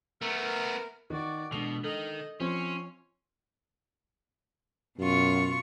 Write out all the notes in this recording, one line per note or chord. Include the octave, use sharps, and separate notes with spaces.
A3 B3 A#4
D#3 F#4 D5
B2 E3 G#3 D4 A4 F7
D#3 A4 D#5
F3 C4 C#4 F4 C#5 C6
F#2 B2 F4 C#6